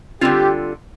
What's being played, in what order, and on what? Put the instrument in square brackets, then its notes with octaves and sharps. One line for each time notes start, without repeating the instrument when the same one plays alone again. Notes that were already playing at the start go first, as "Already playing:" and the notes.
[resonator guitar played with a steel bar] D3 G3 C4 F4 [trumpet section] G4